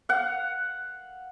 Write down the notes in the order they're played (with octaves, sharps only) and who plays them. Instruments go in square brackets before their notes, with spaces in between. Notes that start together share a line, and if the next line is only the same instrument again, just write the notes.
[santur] F5 F#5